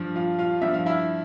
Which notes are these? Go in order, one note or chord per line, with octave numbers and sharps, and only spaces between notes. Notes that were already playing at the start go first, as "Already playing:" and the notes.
Already playing: G2 F3
F4 F5
F4 F5
G2 F3 E5
F5
E4 E5